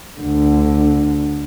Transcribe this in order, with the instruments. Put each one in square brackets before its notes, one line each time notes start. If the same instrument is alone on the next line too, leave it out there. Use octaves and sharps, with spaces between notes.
[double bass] D2 D3